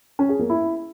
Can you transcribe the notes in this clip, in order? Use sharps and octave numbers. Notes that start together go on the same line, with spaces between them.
C#4
G#4
A#3
E4